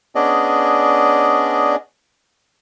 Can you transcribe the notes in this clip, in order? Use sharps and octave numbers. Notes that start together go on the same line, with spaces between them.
B3 C#4 D4 G#4 D5 D#5